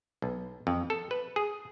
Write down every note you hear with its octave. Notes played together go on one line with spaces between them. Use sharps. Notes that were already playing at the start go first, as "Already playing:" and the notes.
B1
F2
A4
B4
G#4